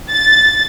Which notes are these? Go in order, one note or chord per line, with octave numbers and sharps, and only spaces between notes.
A6